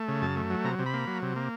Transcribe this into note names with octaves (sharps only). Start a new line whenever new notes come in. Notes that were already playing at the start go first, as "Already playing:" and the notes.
Already playing: A3
C#3
F#2 A5
A3
F#3
C3 A#5
C3
B5
A#3
F#3
C3
A#3